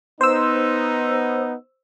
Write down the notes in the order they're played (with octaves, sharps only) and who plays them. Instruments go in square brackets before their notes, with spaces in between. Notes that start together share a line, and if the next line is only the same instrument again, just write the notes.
[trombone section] B3 D#4 [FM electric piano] C5 E6